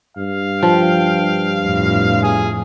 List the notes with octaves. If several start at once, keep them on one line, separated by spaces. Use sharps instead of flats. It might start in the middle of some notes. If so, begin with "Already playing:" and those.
G2 F5
F3 G5
F2 A2
G#4